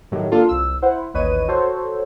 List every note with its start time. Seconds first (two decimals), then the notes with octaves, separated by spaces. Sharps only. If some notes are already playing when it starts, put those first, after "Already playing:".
0.11 A2 D#3 F#3 G4
0.31 A#3 D4 F4 A4
0.49 C2 E6
0.82 E4 C5 F#5
1.14 A1 D#2 B4 C#5 D#5 D#7
1.48 F#4 A4 C5 C#5